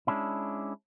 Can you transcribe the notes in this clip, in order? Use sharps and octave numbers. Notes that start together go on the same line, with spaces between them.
G#3 C#4 D4 E4